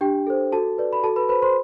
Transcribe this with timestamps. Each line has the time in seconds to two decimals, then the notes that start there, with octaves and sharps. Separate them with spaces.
0.01 D4 G4 G5
0.27 A4 C5
0.52 F#4 A4 A5
0.78 B4 D5
0.93 B5
1.03 F#4 A4 A5
1.16 B4 B5
1.29 B4 C5 B5
1.42 C5 C6